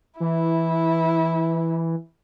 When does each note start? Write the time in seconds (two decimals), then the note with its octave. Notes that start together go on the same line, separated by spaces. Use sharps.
0.20 E3 E4